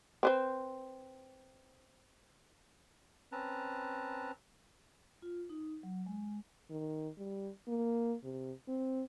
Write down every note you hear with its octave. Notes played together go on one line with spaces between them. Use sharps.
C4 B4 C5
C4 C#4 B4 A5 A#5
F4
D#4
F#3
G#3
D#3
G3
A#3
C3
C4